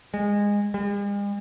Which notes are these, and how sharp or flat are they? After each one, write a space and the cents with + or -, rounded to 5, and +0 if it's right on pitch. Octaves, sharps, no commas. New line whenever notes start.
G#3 -20
G#3 -45